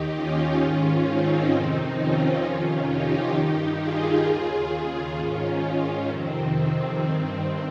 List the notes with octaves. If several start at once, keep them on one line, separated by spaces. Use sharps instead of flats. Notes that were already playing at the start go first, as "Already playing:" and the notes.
Already playing: D#2 D#3 D#4 G4
C#4 F4
G#2 D#3
C4 D#4
F2 C3 D#3
C#4 F4
F2 C3 D#3
D#4 G4
G2 D#3
F4 G#4
D#2 C#3
F4 G#4
G#2 D#3 C#4 F4
C#4 F4
F2 C3 D#3 C4
C4
G2 D#3